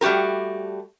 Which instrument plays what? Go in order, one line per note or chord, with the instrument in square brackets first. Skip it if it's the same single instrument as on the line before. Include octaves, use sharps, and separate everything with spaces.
[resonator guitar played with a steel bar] G3 A3 F#4 G4 A#4